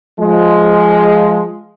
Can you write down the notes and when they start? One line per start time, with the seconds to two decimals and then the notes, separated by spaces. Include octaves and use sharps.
0.19 F3 G#3